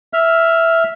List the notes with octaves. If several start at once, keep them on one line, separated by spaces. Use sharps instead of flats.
E5 F6